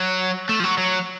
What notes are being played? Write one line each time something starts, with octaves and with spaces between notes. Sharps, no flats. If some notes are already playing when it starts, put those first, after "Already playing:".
Already playing: F#3
A3
F3
F#3
F#3